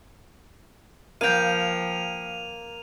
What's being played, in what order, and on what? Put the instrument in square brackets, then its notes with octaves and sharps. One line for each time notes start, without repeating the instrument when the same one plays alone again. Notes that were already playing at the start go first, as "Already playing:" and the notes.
[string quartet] F3 [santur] A#3 [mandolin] F5 G5 [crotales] D#7 F7